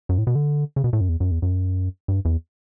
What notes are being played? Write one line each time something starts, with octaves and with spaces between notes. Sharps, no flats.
F#2
A2
B2
D3
C#3
B2
A2
F#2
E2
F#2
E2
F#2
G2
E2